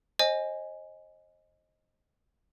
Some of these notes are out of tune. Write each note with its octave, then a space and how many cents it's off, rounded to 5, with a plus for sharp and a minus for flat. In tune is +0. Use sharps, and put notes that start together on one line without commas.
C5 +35 D#5 +0 G#5 +0